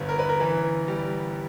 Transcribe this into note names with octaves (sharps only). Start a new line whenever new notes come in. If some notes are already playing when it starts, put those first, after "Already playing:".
Already playing: G1 G2 B4
A#4
B4
A#4
E3 B4
G3